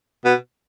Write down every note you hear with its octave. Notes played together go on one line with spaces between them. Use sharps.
B2